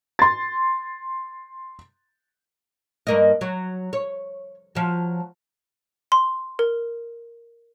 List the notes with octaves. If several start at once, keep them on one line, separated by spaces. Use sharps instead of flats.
C6 A6
G2 A#3 D#5
F#3
C#5
F3 F#3
C6
A#4